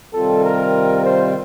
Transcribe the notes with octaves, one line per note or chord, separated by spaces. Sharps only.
C3 D#3 G3 C4 F4 A4
A#4
C5